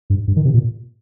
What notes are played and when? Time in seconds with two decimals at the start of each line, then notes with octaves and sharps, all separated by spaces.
0.10 G2
0.28 G2
0.36 D#3
0.45 C3
0.54 A#2